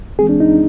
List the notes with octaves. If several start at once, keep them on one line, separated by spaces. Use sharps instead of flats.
E3 G#3 C4 G#4
D4
D#4